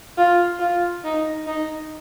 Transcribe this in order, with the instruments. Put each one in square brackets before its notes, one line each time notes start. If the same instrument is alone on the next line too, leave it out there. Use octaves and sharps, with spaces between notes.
[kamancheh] F4
F4
D#4
D#4